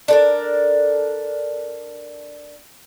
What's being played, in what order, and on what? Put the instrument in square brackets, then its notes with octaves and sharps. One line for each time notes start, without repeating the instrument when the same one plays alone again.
[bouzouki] D4 A4 A#4